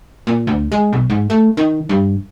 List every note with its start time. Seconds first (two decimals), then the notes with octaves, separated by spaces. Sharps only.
0.27 A#2
0.47 D2
0.72 G#3
0.93 B1
1.10 G#2
1.30 A3
1.57 D#3
1.89 G2